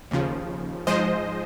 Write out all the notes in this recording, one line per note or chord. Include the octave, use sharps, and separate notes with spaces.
D#2 C#3 F3
G#2 F3 G#3 C5 D#5